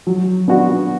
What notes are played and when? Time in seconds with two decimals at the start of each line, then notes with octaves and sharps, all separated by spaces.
0.07 F#3
0.48 B3 D4 F#4